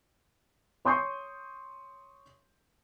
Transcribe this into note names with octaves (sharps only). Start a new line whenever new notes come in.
C#5 C6 C#6 D#6 G6 C7